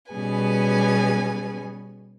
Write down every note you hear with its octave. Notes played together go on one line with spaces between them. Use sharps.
B2 G3 C#4 G#4 B4 G#5